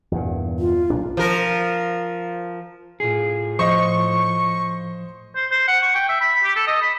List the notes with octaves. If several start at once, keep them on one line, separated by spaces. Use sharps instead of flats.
E2 G2 A#2
F4
B1 A#2 D4
F3 A#4
A2 F4 G#4
F3 C5 D#5 C#6
C5
C5
F#5
C#6
G5
E5
B5
G4
A4
D#5
B5